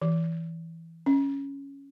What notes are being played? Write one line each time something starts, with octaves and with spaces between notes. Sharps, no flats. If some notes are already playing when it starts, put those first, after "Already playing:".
E3
C#4